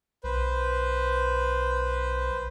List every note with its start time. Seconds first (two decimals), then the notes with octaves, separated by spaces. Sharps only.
0.24 B1 B4 C5